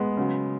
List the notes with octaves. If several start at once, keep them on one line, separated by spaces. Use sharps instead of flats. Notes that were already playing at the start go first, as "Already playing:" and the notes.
Already playing: G#3 B3
C#3 F#3